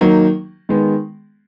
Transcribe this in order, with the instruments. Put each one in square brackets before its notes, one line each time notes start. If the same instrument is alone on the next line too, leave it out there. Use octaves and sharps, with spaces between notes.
[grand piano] D#3 F#3 A#3 D#4
D#3 G#3 B3